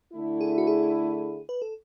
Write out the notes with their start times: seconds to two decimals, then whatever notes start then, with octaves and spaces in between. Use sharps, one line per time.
0.13 D3 A3 E4
0.41 G#4
0.58 F#4
0.67 G#4
1.49 B4
1.62 A4